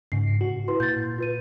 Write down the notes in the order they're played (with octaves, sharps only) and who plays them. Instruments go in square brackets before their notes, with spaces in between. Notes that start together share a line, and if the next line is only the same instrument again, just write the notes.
[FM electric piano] G#2 C#3 [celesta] C7
[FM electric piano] F#4
[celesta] E4 B4 C6
[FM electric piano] A#2 [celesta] G6 A6
[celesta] F4 B4 D#7